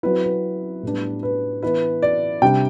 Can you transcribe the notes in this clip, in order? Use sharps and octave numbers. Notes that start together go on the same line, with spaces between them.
F#3 C4 E4 B4
B4
A2 G3 B3 D4
B4
E3 B3 E4 B4
D5
C3 G3 D4 G5